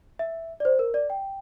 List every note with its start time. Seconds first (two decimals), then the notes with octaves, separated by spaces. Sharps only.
0.19 E5
0.60 D5
0.65 C5
0.79 A#4
0.94 D5
1.10 G5